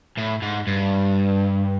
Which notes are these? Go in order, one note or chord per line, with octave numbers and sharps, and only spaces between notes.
A2
G#2
G2